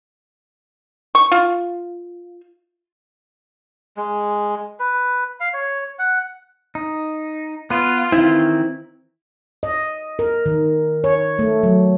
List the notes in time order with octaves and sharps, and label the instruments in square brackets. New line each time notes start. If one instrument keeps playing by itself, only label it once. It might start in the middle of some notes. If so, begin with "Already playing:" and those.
[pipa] C#6
F4
[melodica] G#3
B4
F5
C#5
F#5
[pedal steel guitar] D#4
[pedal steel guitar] B3 B4 [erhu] F4
[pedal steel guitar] D#3 E3 C4 [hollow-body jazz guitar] E4
[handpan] D#5
A#4
D#3
C#5
A3
F#3